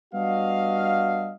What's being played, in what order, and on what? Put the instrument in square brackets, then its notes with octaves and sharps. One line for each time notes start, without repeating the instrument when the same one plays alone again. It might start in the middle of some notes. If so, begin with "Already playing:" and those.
[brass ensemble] G3 B3 D4 F#4 D#5 F5